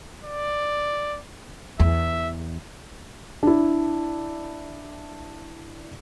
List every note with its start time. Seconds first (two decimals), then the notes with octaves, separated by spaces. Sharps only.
0.24 D5
1.80 E2 E5
3.43 D4 E4